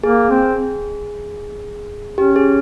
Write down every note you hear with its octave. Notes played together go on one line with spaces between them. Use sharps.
A#3 G#4
C4
C#4 G4
G#4